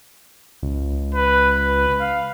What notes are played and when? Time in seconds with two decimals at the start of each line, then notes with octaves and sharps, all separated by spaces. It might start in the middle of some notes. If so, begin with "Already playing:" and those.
0.63 C#2
1.14 B4
1.59 B4
2.00 F5